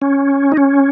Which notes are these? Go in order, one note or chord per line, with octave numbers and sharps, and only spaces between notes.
C#4
D#4
C#4